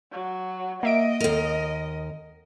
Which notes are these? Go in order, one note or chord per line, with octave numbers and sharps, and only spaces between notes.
F#3
A#3 D#5 E5 D7
D#2 A#4